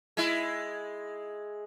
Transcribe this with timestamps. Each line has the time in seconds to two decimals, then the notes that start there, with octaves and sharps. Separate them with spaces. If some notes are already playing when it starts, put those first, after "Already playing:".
0.17 G#3 E4